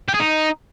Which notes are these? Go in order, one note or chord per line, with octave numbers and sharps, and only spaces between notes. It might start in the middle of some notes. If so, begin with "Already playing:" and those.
G4
G#4
D#4